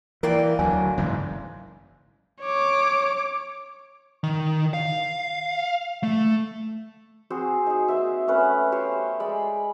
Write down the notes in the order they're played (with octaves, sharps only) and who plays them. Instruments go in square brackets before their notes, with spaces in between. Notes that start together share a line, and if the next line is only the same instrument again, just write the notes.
[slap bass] E3 [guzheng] A#3 D5 G5 [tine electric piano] A#4
[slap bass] D2 F#3 [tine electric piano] G#5
[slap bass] F#1 G#2 E3
[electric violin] C#5 D6
[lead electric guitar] D#3
F5
A3
[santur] C4 F#4 G#4 C5
D#4 G#4
A#3 C5 E5
A3 B3 C#4 B4
G4 C5 C#5 F5
G#3 D5 B5